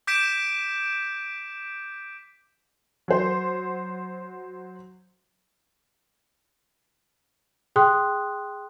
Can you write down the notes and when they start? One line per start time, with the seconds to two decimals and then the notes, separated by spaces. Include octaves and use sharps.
0.07 D6 G6 B6 D7 E7
3.08 F#3 C5
7.76 G#4 G5 C6 D#6 F#6